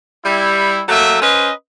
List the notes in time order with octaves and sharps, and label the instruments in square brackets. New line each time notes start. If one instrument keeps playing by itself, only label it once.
[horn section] G3 E4
F#3 A3 A#3 E5
C#4 B4 C5 D#5